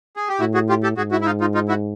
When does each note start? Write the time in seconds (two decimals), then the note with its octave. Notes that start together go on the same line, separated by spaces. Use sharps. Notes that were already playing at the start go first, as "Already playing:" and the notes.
0.17 G#4
0.29 G4
0.40 A2 E4 F#4
0.54 F#4 G#4
0.69 F4 G4
0.83 G4 A4
0.97 G#2 F#4 G#4
1.11 E4 F#4
1.21 E4
1.26 D#4 F4
1.41 D#4 F4
1.55 D#4 F4
1.68 E4 F#4